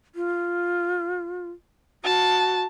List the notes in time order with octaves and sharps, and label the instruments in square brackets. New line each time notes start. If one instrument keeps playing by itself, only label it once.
[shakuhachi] F4
[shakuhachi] F#4 [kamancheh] A5